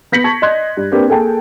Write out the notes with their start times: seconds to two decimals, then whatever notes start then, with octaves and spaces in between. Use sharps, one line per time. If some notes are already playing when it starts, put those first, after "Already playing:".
0.12 B3 G6 A#6 B6 C#7 F#7
0.24 A5 C#6 G#6
0.42 D5 D#5 C6 F#6 G#6
0.77 G2
0.91 A#3 C4 D4 G4 A#4 B4
1.09 A#3 G#4 A4 G5 A5